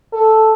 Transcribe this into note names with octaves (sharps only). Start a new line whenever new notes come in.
A4